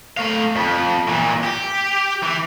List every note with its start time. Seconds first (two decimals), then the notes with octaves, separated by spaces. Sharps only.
0.17 A3 F5
0.56 F2
1.08 A#2 E3
1.44 G4
2.23 E3